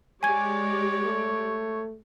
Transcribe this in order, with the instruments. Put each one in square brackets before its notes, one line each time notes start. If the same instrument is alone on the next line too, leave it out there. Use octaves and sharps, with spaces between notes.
[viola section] G#3 G4 D5 [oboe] C#5 [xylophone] G#5 G#6
[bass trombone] A3